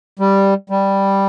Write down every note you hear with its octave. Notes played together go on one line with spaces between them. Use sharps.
G3
G3